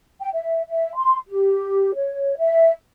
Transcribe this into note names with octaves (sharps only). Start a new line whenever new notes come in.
G5
E5
E5
C6
G4
C#5
E5